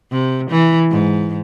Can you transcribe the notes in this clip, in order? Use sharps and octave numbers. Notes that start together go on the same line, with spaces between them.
C3
E3
G#2